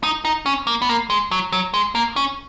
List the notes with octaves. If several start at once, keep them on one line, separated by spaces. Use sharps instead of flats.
D#4
D#4
C#4
A#3
B3
A#3
G#3
F#3
F#3
G#3
A#3
C#4